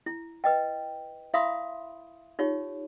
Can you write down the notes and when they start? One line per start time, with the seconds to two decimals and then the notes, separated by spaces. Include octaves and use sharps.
0.06 E4
0.44 B4 D#5 G5
1.34 E4 E5 F5 B5 C6 D#6
2.39 D#4 F4 G4 C#5